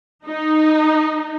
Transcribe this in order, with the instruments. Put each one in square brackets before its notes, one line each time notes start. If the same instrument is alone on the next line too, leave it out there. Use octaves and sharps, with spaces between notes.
[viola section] D#4